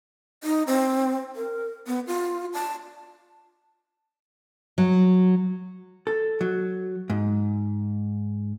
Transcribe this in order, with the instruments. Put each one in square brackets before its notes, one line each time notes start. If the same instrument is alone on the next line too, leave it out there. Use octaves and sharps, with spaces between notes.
[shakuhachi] D#4
C4
A#4
B3
F4
A5
[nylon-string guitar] F#3
[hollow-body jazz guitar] A4
F#3
G#2